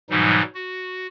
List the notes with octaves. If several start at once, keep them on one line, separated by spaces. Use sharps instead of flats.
G#2 B2 E3 F#3 G3 D#4
F#4